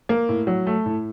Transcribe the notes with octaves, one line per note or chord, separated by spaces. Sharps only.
A#3
A2
F#3
A3
A2